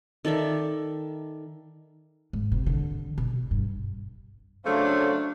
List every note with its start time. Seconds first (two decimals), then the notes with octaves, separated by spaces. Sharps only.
0.25 D#3 A4 D5 E5
2.33 G#2
2.52 C3
2.66 D3
3.18 B2
3.51 G2
4.65 C#3 F#3 A3 D4 C5 C#5 F5